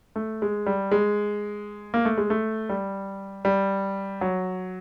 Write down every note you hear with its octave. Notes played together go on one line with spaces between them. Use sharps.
A3
G#3
G3
G#3
A#3
A3
G#3
A3
G3
G3
F#3